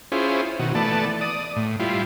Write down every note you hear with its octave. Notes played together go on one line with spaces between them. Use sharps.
C#4 E4 F4 G#4 C5
B2 D#3 F#4
E3 A3 B3 D5 A5
D5 D#6
A2
G3 E4 F4